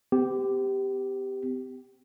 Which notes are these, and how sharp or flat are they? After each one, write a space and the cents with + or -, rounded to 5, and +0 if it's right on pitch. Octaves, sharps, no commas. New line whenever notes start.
C4 -45 G4 +0